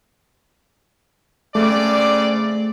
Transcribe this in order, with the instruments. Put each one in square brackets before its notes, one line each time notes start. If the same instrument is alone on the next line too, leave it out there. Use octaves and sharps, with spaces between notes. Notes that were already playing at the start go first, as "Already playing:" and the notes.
[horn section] C#3 C4 D5 [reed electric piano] A3